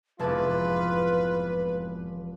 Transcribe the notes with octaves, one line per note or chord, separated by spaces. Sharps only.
F1 E2 G#2 F4 B4 A5 D6